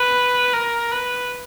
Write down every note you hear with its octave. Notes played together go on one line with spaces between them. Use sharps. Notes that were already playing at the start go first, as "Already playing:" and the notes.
Already playing: B4
A#4
B4